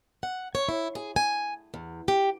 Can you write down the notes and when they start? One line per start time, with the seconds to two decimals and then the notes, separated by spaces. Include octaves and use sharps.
0.23 F#5
0.55 C#5
0.69 E4
0.95 G#4
1.16 G#5
1.74 E2
2.08 G4